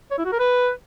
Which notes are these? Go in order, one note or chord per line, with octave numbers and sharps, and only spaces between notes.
C#5
E4
F#4
A#4
B4